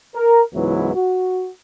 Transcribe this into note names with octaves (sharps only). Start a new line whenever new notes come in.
A#4
C#2 G#2 E3 F#3 B3 E4
F#4